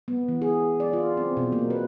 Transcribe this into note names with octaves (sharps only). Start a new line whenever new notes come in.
B3
E3
G#4
D5
F4
C4
B2
A#3
B4